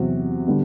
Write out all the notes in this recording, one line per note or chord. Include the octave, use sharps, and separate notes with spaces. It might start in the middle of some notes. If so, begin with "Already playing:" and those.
Already playing: E2 C3 F#3 C4 F#4
D3 G3 B3